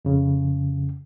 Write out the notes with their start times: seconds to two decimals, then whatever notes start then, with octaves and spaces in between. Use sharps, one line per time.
0.05 F2 C#3